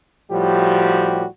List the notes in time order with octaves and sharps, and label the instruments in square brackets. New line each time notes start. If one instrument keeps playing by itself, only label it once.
[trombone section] A2 F3 G3 F#4 G4